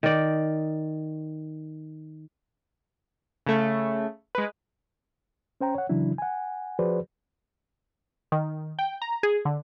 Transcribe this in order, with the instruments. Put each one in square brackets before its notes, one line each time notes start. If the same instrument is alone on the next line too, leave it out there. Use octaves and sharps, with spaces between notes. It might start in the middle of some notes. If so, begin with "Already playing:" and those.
[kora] D#3 D5
[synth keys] C#3 A3
G#3 B4
[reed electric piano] C#4 C5 G5 A#5
C#5 F#5
C#3 E3 F#3 D4 E4
F#5 G#5
F3 F#4 G#4 B4 C5 D5
[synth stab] D#3
G5
A#5
G#4
D3